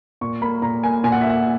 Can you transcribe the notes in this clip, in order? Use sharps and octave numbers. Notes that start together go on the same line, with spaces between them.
A#2 C#6
A#3 B5
A#2 A#5
A#3 G#5
A#2 G#5
F#5
E5
A#2 F#5